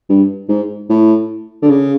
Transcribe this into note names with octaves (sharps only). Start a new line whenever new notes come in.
G2
G#2
A2
D3
C#3